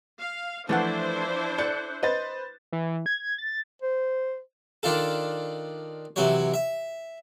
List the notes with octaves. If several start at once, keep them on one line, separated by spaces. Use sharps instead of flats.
F5
E3 F3 A3 D4 E4 A4 C5 F#5
A4 D5 F#6 G6 C#7
B4 C5 D#5 A6
E3
G#6
A6
C5
D#3 D4 F4 A4
C3 E3 F#3 C#5
E5